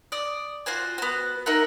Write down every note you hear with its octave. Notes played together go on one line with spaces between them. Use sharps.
D5 D#6
F4 F#4 C5 G#5
B3 F#4
D#4 A#4 E5 F#5